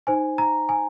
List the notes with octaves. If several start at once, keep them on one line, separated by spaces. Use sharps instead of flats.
D#4 C5 G#5
A#5
G#5